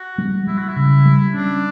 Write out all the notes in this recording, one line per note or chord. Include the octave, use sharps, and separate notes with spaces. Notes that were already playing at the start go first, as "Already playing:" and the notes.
Already playing: F#4
G3
G3 E4
F#4
E4
C#3
G3
C#4 D4